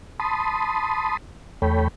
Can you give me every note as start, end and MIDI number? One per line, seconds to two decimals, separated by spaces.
0.20 1.17 81
0.20 1.17 83
0.20 1.17 84
0.20 1.17 87
1.62 1.88 40
1.62 1.88 57
1.62 1.88 69
1.62 1.88 73
1.62 1.88 79
1.62 1.88 83